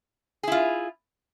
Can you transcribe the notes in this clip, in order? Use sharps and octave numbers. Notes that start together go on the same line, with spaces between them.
E4 F4 G#4